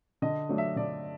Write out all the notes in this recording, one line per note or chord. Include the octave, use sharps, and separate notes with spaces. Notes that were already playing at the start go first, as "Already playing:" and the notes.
D3 D#5
F#3 A3 D4
E5
D3 D5